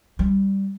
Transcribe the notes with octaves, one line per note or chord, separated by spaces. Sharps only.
G3